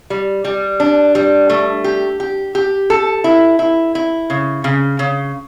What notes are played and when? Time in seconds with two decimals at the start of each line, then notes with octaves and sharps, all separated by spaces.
0.10 G3
0.45 G3
0.80 D4
1.15 G3
1.50 A3
1.84 G4
2.20 G4
2.55 G4
2.90 A4
3.24 E4
3.59 E4
3.95 E4
4.30 C#3
4.64 C#3
4.99 C#3